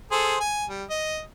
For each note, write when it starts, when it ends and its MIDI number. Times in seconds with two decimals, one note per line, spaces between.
0.12 0.36 68
0.12 0.36 69
0.12 0.36 72
0.40 0.65 80
0.68 0.84 55
0.90 1.22 75